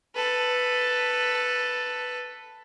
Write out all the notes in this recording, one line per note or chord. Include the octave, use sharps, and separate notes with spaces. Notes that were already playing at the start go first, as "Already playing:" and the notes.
A4 B4